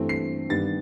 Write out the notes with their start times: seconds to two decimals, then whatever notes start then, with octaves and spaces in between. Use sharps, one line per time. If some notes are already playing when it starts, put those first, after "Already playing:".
Already playing: G2 E3 A3 C4
0.09 C7
0.49 G2 D#3 G3 B3 A6